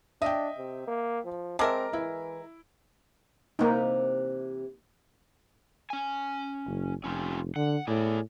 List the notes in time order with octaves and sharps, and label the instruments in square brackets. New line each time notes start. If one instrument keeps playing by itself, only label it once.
[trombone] D4 [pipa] D#5 [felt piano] E5 G5
[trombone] C3
A#3
F3
[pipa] G#3 A#4 E5 [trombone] C4 [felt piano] A5 A#5 D6
[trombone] E3 [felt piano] E4
[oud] C3 E3 [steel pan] A#3 D#4
[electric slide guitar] C#4 G#5
[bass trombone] F#1
[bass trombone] F1 [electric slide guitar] C#4 F4 G4
[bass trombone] D3 [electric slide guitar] F#5
[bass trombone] A2 [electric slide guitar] G#4 D5